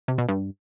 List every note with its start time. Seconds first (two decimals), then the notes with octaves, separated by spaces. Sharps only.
0.08 C3
0.18 B2
0.29 G2